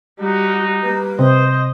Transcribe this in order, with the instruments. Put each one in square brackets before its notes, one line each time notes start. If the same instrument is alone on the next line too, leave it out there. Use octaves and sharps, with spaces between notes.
[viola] G3 F#4 [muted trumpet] D#4
[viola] G3 A#3 [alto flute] B4
[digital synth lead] C3 [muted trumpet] C5 [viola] D#5